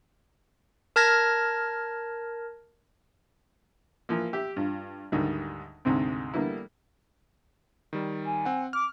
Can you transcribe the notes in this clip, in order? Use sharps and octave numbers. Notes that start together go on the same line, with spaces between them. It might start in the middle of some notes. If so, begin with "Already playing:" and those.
A#4 A5 F6 G#6 A#6
E3 F3 A#3
G4 E5
G2 F4
D2 G#2 D#3 G3
D2 G#2 C3 C4
D3 G3 A#3 B3 E4
D#3 G3
G#5
C4 F#5
D6 F6